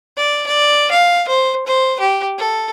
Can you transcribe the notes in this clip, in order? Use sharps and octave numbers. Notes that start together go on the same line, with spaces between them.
D5
D5
F5
C5
C5
G4
A4